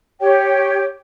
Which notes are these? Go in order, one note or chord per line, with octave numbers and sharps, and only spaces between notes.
G4 C#5 G5